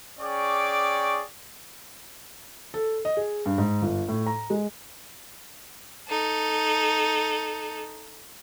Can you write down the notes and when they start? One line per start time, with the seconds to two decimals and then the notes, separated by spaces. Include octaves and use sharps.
0.19 C#4 G#4 D5 G5 C#6 D6
2.74 A4
3.05 D#5
3.17 G#4
3.46 G2
3.58 G#2
3.82 G1
4.09 A2
4.26 A#5
4.50 G#3
6.08 D#4 A4